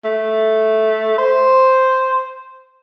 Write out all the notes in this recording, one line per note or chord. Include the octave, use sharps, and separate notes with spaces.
A3
C5